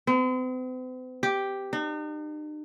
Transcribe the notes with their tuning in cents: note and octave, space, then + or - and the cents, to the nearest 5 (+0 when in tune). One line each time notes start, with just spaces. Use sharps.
C4 -45
G4 +0
D#4 -45